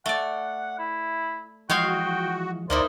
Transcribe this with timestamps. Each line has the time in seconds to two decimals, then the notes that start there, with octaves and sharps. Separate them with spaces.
0.06 A3 D5 F#5
0.79 E4
1.70 E3 F3 G#3 F#4 C#5 F5 G5
2.70 D2 A#3 D#4 E4 A#4 C5 D5